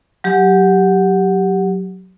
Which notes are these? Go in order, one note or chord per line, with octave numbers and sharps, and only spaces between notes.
F#3 G4